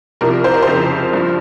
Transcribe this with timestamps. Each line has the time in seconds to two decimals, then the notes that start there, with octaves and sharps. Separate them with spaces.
0.21 C2 C3 F3 A#4
0.44 C5
0.54 A#4
0.62 F2 C#3 F3 C5
1.13 G2 F3